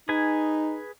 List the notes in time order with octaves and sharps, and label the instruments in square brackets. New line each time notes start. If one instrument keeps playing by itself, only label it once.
[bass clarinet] D#4 [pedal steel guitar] G#4 B4 G#5